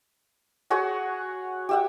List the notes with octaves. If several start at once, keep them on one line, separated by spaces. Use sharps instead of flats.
F#4 G#4 C#5 F#5
G4 E5 F#5